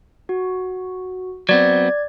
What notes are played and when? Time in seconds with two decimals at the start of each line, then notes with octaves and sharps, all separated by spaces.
0.29 F#4
1.49 F#3 B3 C4 D5 G#6